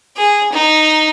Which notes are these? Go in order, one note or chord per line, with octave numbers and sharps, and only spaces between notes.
G#4
D#4